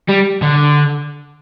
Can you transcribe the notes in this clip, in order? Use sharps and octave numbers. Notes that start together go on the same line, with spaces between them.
G3
D3